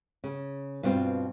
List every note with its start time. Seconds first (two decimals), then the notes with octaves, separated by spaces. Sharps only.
0.24 C#3
0.83 G2 B2 C4 F4